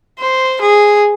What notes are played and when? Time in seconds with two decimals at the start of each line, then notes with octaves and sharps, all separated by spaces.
0.20 C5
0.61 G#4